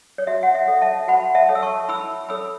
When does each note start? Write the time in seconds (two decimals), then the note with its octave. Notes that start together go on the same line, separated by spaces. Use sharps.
0.18 C#5
0.27 F#4 E5
0.43 F#5
0.55 E5
0.68 A4 C#5
0.82 E5 A5
1.08 F#4 F#5 B5
1.35 E5 A5
1.49 A4 C#5
1.55 E6
1.62 A5 C#6
1.89 E4 B5 E6
2.29 A4 C#5 B5 E6